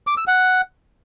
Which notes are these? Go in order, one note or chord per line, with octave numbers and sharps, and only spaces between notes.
D6
E6
F#5